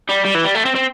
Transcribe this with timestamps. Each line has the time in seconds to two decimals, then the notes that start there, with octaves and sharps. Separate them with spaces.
0.09 G3
0.25 G3
0.35 E3
0.44 G3
0.55 A3
0.65 C4
0.75 C4